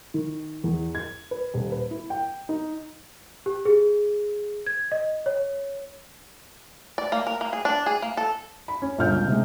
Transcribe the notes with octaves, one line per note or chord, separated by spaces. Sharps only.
D#3
E2
G#6
B4
D#1
B4
E4
G5
D#4
G4
G#4
G#6
D#5
C#5
D5
A#3
A#4
A#3
G#4
D4
G#4
A#3
A4
B5
C#4
G1 A#2 F6 G6
C#2
C3 G#3